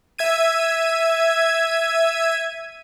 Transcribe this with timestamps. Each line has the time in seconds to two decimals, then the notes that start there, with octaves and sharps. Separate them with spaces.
0.19 E5 G#6 D#7